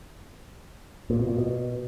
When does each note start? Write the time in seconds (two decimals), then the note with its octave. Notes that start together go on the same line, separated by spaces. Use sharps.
1.10 A#2
1.19 B2
1.29 A#2
1.38 B2